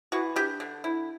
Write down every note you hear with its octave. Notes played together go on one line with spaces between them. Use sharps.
E3 F#4
D4 G4
D3
E4